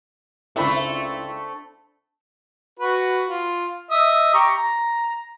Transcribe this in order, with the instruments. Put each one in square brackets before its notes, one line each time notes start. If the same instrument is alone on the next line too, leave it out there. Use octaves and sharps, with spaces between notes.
[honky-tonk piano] C#2 E4 [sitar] A3 [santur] C4 B5 C#6 [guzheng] D4 C5
[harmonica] F#4 B4
F4
D#5 E5 D#6
G4 A#5 C#6
A#5